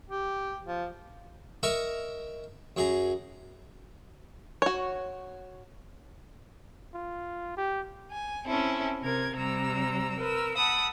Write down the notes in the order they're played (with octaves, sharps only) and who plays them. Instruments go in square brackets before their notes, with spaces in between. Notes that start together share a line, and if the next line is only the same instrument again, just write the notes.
[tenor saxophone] G4
F3
[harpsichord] A#4 D#5 E5 A#5 C#6
F#2 G#4 A#5
[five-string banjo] F#4 C#5
[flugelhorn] F4
G4
[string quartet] G#5
C4 C#4 E4 A4
C3 A#4 G#6
C3 G3 A#5 E6
A#4 B4 E6
F#5 A5 B5 D#6 E6